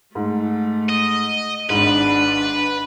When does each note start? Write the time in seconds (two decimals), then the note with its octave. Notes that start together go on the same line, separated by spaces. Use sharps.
0.15 G#2 A3
0.89 D#5
1.70 G#1 G#2 D4 B4